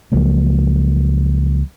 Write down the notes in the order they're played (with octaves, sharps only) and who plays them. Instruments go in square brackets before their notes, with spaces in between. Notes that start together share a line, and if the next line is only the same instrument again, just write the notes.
[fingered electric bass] C#2 F3 F#3 A#3